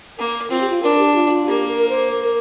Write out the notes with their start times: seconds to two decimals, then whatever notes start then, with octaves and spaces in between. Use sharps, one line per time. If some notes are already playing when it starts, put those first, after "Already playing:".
0.18 A#3 A#4
0.50 C4 F4
0.61 G4
0.70 F4
0.83 D4 A#4
0.99 G4
1.15 F4
1.30 F4
1.47 A#3 G4
1.68 A#4
1.79 A#4
1.89 C5
2.11 A#4
2.24 A#4